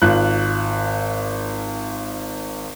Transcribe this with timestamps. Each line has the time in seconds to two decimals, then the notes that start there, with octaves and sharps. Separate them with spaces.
0.02 G#1 F4 F#6